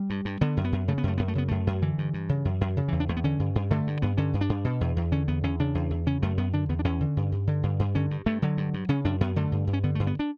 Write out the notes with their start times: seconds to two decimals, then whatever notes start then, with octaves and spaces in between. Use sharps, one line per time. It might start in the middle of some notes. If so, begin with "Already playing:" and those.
Already playing: G3
0.10 G2
0.25 G2
0.41 D3 B3
0.57 F#2
0.65 B3
0.72 F#2
0.88 C#3 A3
0.98 B3
1.03 F#2 A3
1.18 F#2 B3
1.28 A3
1.35 C#3 B3
1.48 F#2 A3
1.67 F#2
1.82 D3 E3
1.98 G2
2.14 G2
2.29 C#3
2.45 F#2
2.61 F#2
2.77 C#3
2.88 E2 E3
3.00 D4
3.09 E2 A3
3.16 B3
3.24 D3 C#4
3.40 G2
3.55 G2
3.71 D3 A3
3.87 G2
4.02 G2 B3
4.17 D3 C#4
4.34 G2
4.41 D4
4.49 G2
4.65 B2
4.81 E2
4.97 E2
5.12 D3 C#4
5.28 E2 B3
5.43 E2 C#4
5.59 C#3 D4
5.75 E2
5.91 E2
6.07 C#3 C#4
6.22 F#2 A3
6.38 F#2 B3
6.53 D3 D4
6.69 E2 B3
6.79 D4
6.85 E2 C#4
7.01 D3
7.17 G2
7.32 G2
7.47 D3
7.63 G2
7.79 G2
7.95 D3 C#4
8.11 G2
8.26 G2 A3
8.42 D3 F#3
8.57 G2
8.74 G2
8.89 C#3 C#4
9.05 F#2 D4
9.21 F#2 B3
9.36 D3 A3
9.52 G2
9.67 G2
9.73 C#4
9.84 D3 B3
9.95 G2 A3
10.07 B3
10.19 D4